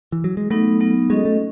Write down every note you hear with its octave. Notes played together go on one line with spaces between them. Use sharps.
E3
F#3
G#3
F#3 A3 B3 D#4
F#3 B3 D#4
G#3 C#4 F#4 A4 D#5
A3